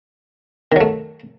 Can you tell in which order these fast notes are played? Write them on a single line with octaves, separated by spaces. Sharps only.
D#3 F#3 A3